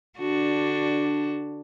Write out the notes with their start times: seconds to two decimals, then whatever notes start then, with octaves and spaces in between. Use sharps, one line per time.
0.18 D3 D4 F#4